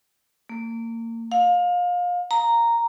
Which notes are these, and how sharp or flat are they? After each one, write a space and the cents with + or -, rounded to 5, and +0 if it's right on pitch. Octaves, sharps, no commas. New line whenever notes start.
A#3 -30
F5 +30
A#5 -5